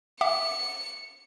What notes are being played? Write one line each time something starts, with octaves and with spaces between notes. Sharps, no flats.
E5 F#5 D6 C#7